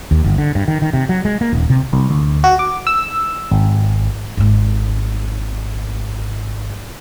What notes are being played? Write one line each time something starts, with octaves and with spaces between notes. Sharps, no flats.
D#2
G1
D3
G2
D#3
D#3
C3
F#3
G#3
A#3
D#1
C3
C2
D2
F#4
D6
E6
G#1
G#1 G#2